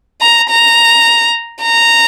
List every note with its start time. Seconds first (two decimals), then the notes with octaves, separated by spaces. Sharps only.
0.21 A#5
0.49 A#5
1.63 A#5